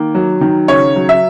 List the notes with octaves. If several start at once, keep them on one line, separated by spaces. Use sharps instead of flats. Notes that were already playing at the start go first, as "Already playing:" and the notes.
Already playing: D#3 A#3
F#3
D#3
C#3 C#5
F#3
E5